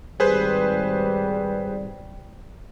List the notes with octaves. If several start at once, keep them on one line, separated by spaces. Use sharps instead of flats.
G#1 G3 G#4 B4 C5